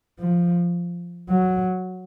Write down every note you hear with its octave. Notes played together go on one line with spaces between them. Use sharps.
F3
F#3